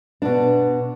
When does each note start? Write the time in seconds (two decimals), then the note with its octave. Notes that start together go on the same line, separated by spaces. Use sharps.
0.22 B2 D4